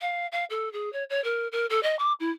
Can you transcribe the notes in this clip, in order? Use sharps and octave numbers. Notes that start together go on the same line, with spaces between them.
F5
F5
A4
G#4
C#5
C#5
A#4
A#4
A4
D#5
D6
E4